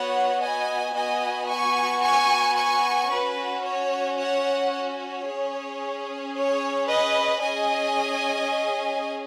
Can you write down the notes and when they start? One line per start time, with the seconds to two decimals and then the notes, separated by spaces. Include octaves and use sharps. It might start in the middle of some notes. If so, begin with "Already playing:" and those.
Already playing: B3 F#4 C#5 F#5
0.42 D#5 G#5
0.95 B3 F#4 D#5 G#5
1.50 G#5 C#6
2.03 G#5 C#6
2.57 G#5 C#6
3.11 C#4 F#4 B4
3.65 C#5
4.19 C#5 F#5
4.73 C#5
5.27 C#4 G#4
6.35 C#5
6.88 B4 D#5
7.42 C#4 G#4 D#5 G#5